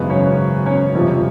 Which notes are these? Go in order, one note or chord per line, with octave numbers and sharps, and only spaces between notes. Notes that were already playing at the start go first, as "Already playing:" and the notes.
Already playing: G#1 F#2 C#3 E3 G#3 B3 B4
C#4 C#5
C#4 C#5
G1 F2 C3 F3